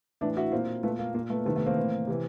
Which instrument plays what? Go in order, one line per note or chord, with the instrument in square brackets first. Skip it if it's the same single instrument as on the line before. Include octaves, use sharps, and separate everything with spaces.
[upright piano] A2 E3 D4 E4
E4 F#4
A#2 A#3 C4
A#2 A3 B3
A#3
A#2 A#3
A3 B3
C3 D#3 A3 B3
A3 B3
A#3 C4
A2 E3
C3 E3